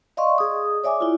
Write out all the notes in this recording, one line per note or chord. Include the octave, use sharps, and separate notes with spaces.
D5 D#5 F5 C6 C#6
G#4 D#6
C#5 D5 E5 G#5 D6
E4 F4